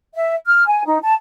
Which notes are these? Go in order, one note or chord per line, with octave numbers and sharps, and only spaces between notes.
E5
F6
G#5
D#4
A5